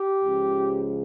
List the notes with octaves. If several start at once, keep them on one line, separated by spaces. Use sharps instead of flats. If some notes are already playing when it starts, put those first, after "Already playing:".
Already playing: G4
C#2 C#3 F3